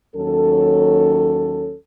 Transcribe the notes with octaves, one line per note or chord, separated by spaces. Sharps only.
D#2 F#3 C#4 A4